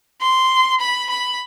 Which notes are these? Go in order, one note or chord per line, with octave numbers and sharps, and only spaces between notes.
C6
B5
B5